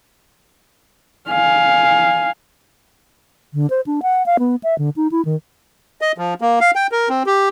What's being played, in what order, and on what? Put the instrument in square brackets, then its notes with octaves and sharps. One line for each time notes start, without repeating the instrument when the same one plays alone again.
[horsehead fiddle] F5 G#5
[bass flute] D3
C5
D4
F#5
F5
B3
E5
D3
D#4
E4
D#3
[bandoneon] D#5
F3
A#3
F5
G5
A#4
C4
G4